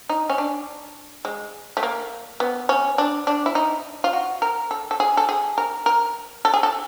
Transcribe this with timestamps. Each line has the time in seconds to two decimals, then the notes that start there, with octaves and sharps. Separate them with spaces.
0.09 D#4
0.30 C#4
0.38 D4
1.25 G#3
1.77 A3
1.83 A#3
2.40 B3
2.69 C#4
2.98 D4
3.27 D4
3.46 E4
3.55 D#4
4.04 F4
4.13 F#4
4.42 A#4
4.71 A4
4.91 A4
5.00 G#4
5.17 A4
5.29 G#4
5.58 A#4
5.86 A#4
6.45 A4
6.54 G#4
6.63 A4